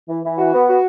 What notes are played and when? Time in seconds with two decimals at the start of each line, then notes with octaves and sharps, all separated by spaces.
0.09 E3
0.23 E3
0.38 F#4
0.53 B3
0.68 F#4